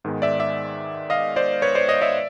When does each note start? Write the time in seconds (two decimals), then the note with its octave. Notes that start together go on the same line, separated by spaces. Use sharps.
0.05 G#2 D#3 G#3 B3
0.22 D5 E5
0.40 D5 E5
1.10 D#5 F5
1.36 C5 D5
1.62 B4 C#5
1.75 C5 D5
1.89 C#5 D#5
2.01 D5 E5